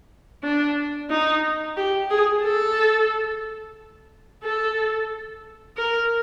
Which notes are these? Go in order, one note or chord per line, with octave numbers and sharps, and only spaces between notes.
D4
D#4
G4
G#4
A4
A4
A#4